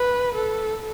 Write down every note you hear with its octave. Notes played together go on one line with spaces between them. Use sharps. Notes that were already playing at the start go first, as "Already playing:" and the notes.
Already playing: B4
A4